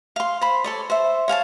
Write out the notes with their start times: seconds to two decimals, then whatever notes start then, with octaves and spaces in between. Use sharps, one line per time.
0.16 F5 C6
0.41 C5 B5
0.64 A4 C#5 D5
0.90 C5 E5
1.28 C#5 F5 G#5 A5